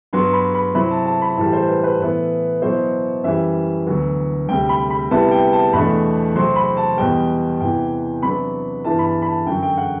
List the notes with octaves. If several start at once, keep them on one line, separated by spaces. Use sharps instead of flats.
G2 F#3 B3 C6
B5
B5
C3 F#3 C4 E4 B5
A5
A5
B5
A2 E3 G3 A5
C5
B4
B4
A2 E3 B3 E4
B2 F#3 B3 E4 C5
F#2 E3 G3 E5
D2 D3 F#3 B3
D2 C3 G3 G5
B5
B5
C3 G3 B3 E4 A5
G5
A5
E2 B2 A3 D4 B5
C3 F#3 C4 C6
B5
A5
E2 B2 G3 G5
E2 C3 E3 G5
C3 F#3 B3 D4 B5
G2 E3 B3 E4 A5
B5
A5
B5
A5
F#2 D3 F#3 G5
G5
F#5